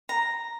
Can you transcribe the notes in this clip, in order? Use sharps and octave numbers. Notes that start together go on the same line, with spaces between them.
A#5